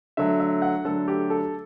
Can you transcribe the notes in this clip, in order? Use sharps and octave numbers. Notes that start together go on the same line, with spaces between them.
D3 F#3 A3 E5
E5
F#5
D3 F#3 A3 A4
G4
A4